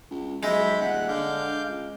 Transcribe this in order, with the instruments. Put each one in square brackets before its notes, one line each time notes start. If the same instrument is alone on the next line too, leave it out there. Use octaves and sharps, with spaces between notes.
[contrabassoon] C#2
[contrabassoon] B1 [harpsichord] G#3 [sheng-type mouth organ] E5 B5 G6
[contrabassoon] D#1 [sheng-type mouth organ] F#5 F#6
[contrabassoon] D3 [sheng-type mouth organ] F5 D6 G6
[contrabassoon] C#2